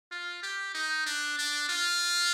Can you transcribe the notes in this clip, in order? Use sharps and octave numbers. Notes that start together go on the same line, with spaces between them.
F4
G4
D#4
D4
D4
F4